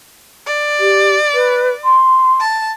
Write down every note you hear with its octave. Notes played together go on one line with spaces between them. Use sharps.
D5
G4
B4
C6
A5